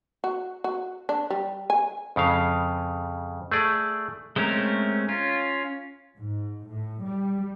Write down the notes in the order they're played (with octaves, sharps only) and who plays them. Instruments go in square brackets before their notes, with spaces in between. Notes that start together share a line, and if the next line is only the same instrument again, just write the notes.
[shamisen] F#4
F#4
D4
G3
G#5
[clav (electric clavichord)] F2 C#3 F5
A3 G#4 D5
[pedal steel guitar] G#3 A3 C4 C#4 A#4
C#4 F4
[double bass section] G#2
A2
G3